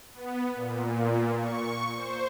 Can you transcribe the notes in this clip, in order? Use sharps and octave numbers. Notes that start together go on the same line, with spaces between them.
B3
A#2
C#6
C5